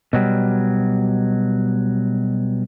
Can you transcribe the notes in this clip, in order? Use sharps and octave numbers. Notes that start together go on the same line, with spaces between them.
B2 F#3 G3